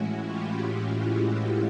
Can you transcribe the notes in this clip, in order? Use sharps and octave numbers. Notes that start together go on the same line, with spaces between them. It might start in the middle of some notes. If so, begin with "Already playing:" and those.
Already playing: A2 E3 G#3 C#4 E4 F#4
F4 G4